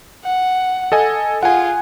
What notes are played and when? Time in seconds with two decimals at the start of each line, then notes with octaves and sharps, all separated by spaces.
0.24 F#5
0.92 A4 D#5 G#5
1.43 F4 G#4 F#5 G#5